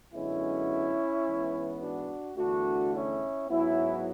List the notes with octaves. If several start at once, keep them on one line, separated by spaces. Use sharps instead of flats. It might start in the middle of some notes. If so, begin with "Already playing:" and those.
F#2 D3 G#3 B3 C#4 E4
G#2 E3 B3
D4 F#4
E2 D3 A3 D4 F#4
C#4 E4
G#2 F#3 B3 C#4 E4